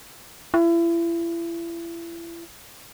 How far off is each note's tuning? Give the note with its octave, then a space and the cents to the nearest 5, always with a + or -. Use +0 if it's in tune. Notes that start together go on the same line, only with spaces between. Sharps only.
E4 +35